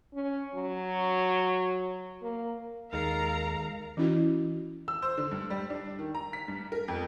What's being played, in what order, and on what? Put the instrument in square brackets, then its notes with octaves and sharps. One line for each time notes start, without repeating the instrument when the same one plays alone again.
[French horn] C#4
F#3
A#3
[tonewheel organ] D#2 A4 [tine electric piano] D#3 G#3 [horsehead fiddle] A#4 [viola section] F5 A#5
[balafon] E3 C#4 E4 F#4
[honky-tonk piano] E6
C5
D3
G2
G3
D4
D#3
A#5
B6
G2
A#4
F2